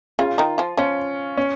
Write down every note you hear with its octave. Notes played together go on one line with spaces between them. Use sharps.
C#3 C#4 F4
D#3 D#4
F3 F4
F3 C#4 F4
C#4